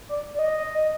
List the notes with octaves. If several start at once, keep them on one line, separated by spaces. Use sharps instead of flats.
D5
D5
D#5